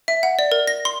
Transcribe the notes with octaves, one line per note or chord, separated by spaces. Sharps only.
E5
F#5
D5
A#4
A#6
C6